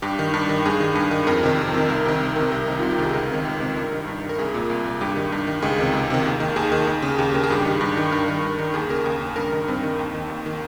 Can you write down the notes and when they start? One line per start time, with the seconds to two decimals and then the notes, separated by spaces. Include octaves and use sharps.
0.02 G2 G4
0.19 D#3
0.34 G2
0.49 D#3
0.66 G2 G#4
0.80 D#3
0.95 G2
1.11 D#3
1.27 F2 A#4
1.43 C3 D#3
1.58 F2
1.74 C3 D#3
1.89 C2 A#4
2.06 C3 D#3
2.21 C2
2.36 C3 D#3
2.52 C2 A#4
2.67 C3 D#3 D#4
2.79 C2 F4
2.91 G4
2.98 C3 D#3 G#4
3.13 C#2 A#4
3.30 C3 D#3
3.45 C#2
3.60 C3 D#3
3.76 G2 A#4
3.92 D#3
4.08 G2
4.22 D#3
4.29 A#4
4.38 C2 G#4
4.54 A#2
4.70 C2
4.85 A#2
5.01 G2 G4
5.16 D#3
5.32 G2
5.47 D#3
5.62 C#2 G#4
5.78 C3 D#3
5.93 C#2
6.10 C3 D#3
6.26 D#2
6.40 D#3
6.56 D#2 G#4
6.72 D#3
6.87 D#2
7.02 C#3
7.18 D#2 G4
7.34 C#3 A#4
7.44 G#4
7.50 G2 G4
7.62 D#3 G#4
7.81 G2
7.97 D#3
8.11 G2 A#4
8.28 D#3
8.43 G2
8.58 D#3
8.74 D#2 G#4
8.89 C#3 A#4
9.05 D#2 A#4
9.21 C#3
9.36 G2 A#4
9.52 D#3 A#4
9.68 G2 C4
9.83 D#3
9.99 D#2
10.14 D#3
10.30 D#2
10.46 D#3